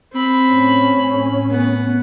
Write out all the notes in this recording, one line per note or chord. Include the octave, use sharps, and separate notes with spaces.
C4 B5
A2 C#4
B3